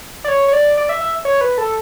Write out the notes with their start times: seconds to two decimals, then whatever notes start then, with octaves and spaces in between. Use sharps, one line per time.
0.24 D5
0.28 C#5
0.48 C#5
0.53 D5
0.77 D5
0.89 E5
1.01 E5
1.25 C#5
1.41 B4
1.58 A4